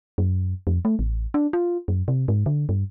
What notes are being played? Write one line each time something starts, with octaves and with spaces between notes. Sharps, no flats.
F#2
F2
A3
A1
D4
F4
F#2
C3
G#2
D3
G2